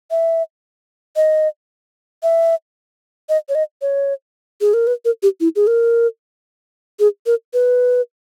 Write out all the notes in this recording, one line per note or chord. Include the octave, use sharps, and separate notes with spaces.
E5
D#5
E5
D#5
C#5
D#5
C#5
G#4
A#4
B4
A#4
G4
E4
G#4
A#4
G#4
A#4
B4